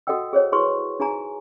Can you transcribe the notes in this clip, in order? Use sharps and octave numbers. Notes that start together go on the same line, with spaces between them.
F#4 A4 D#5 F#5 G5 E6
G#4 C5 C#5
E4 F#4 G#4 B4 C6 C#6
D#4 G#4 G#5 A#5